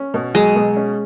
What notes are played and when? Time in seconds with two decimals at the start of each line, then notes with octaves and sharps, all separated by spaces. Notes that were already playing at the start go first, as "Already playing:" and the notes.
Already playing: C#4
0.14 B2
0.35 F#3 G#3
0.56 B2
0.76 C#4